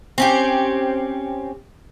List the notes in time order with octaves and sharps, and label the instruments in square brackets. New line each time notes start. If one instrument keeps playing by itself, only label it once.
[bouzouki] C4 C#4 G4